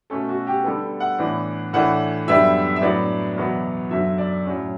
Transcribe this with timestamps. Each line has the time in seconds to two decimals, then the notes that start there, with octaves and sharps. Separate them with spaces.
0.10 B2 A3 C#4 A4
0.29 F#4
0.47 G4
0.64 D3 G3 B3 A4
1.00 F#5
1.18 A2 E3 B3 D4
1.73 A2 E3 A3 D4 F#5
2.27 F#2 D3 G3 B3 D4 E5
2.76 E5
2.81 A2 F#3 B3 D4 D5
3.36 E2 B2 F#3 B3
3.91 F#2 D3 F#3 E5
4.18 D5
4.46 A2 F#3 C#4